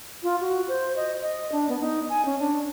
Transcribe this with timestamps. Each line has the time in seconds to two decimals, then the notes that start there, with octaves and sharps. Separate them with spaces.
0.23 F4
0.41 F#4
0.68 C5
0.96 D#5
1.21 D#5
1.52 D4
1.69 B3
1.81 D#4
2.09 G#5
2.25 C#4
2.39 D4